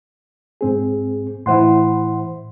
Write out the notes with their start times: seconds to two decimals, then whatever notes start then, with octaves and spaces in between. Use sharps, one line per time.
0.61 G#2 C4 G#4
1.46 A2 E3 E4 C5 F#5 C6